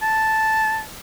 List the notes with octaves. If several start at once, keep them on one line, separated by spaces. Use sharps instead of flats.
A5